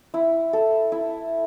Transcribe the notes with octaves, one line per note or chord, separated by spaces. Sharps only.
E4
A4
E4